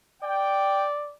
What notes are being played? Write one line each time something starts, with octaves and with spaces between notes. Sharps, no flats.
D5 G5